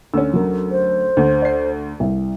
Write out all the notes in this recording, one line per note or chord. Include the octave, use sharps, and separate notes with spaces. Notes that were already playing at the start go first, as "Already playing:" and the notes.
D2 C#4 E6
F#3 A#4
C5
D2
D5 C7
C2